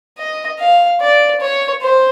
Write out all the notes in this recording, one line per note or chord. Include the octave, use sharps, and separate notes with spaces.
D#5
F5
D5
C#5
C5